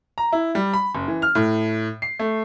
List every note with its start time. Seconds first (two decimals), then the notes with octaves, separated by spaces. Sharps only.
0.18 A#5
0.32 E4
0.55 G3
0.74 B5
0.95 F#1
1.08 E3
1.22 F6
1.35 A2
2.02 C7
2.19 A3